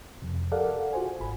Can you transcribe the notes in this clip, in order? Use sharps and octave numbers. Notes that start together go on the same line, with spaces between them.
F2 C3
G4 A4 A#4 D5 F5 F#5
F4 F#4 G#4 C5 G#5
G#1 B5